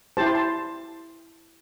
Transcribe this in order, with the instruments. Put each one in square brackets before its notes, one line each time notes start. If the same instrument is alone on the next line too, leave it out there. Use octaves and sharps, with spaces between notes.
[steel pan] E4 G4 C5 A5
C6
A5